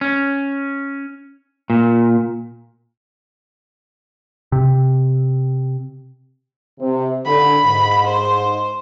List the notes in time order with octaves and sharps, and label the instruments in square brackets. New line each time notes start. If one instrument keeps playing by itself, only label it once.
[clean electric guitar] C#4
A#2
[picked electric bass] C3
[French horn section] C3
[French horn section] D3 [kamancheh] B5
[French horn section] G#2
[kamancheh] C5